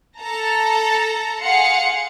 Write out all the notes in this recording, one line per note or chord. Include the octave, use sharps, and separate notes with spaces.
A4 A5 A#5
G#4 F5 F#5 C6 C#7